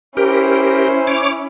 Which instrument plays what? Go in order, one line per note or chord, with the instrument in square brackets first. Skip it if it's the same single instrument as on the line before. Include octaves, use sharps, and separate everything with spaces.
[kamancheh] C#4 E4 [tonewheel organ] G4 A#4 [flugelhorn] C5
[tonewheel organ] C#5 D6